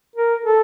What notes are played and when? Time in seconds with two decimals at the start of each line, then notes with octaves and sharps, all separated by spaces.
0.16 A#4
0.45 A4